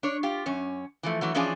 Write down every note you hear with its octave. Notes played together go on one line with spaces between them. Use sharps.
D4 C#5
F4 G4
F#2 C#4
E3 F3 A3
E3 F#3 A3
E3 F3 C#4 D4 F4 G#4